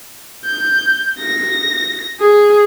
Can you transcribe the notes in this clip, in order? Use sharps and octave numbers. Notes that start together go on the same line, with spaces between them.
G6
A#6
G#4